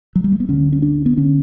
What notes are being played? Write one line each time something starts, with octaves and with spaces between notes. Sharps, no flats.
F#3
G3
A3
B3
D2 D3 C#4
C#4
D4
B3
D3 C#4